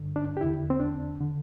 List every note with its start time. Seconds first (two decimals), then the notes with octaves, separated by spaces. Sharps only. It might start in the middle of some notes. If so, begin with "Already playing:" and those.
Already playing: G2 D3
0.16 D4
0.37 G4
0.41 E2 D3 E4
0.70 C4
0.80 D4
1.20 D3